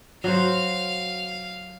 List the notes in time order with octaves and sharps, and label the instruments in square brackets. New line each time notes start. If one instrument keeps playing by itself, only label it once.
[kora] F#3 F#4 C5 [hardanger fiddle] F5